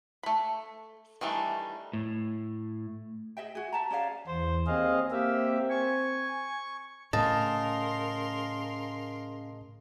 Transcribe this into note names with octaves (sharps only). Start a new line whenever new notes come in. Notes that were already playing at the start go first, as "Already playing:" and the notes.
A3 B5
D#3 E3 G3 A3 D4
A2
G#4 D#5 E5 G5
F#4 G#4
E5 A5 A#5
C#4 G#4 D5 F5
E2 C5
D#2 C4 G#4 D#5 F5
A#3 C4 G4 E5 F5
G#5 C#6
A2 C#3 A3 A#4 D#5 A5 C6